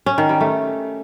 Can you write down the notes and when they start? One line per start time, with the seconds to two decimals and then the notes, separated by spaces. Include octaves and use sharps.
0.06 C#4
0.18 D#3
0.29 G3
0.41 A3